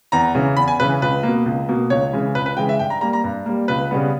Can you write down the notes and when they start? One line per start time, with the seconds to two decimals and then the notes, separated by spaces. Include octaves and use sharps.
0.12 E2 A#5
0.35 C#3 E3
0.57 E2 B5
0.68 G#5
0.80 C#3 E3 B4
1.02 C#2 B4
1.23 B2 A#3
1.46 C#2
1.69 B2 A#3
1.90 C#2 C#5
2.13 C#3 E3 G#3
2.35 C#2 B4
2.46 B4
2.57 C#3 E3 G#3 G5
2.69 E5
2.79 G2 G5
2.90 A#5
3.01 G3 A#3 A#5
3.13 A#5
3.24 G2
3.46 G3 A#3
3.68 C#2 B4
3.91 C#3 G3 B3